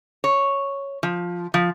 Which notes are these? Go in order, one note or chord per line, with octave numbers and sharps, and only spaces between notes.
C#5
F3
F3